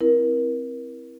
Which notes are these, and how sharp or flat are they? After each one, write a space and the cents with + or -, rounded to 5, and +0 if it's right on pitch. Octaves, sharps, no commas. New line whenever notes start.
C4 +0 E4 +0 A#4 +30